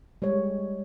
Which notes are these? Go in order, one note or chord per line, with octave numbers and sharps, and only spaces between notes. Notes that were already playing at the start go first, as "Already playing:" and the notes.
G3 G#3 C#5